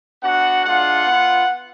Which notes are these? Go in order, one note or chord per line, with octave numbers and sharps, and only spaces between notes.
B3 D4 F#4 F#5
G#3 D4 F4 F#5
B3 F4